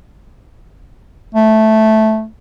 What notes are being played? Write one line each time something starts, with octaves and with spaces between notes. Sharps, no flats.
A3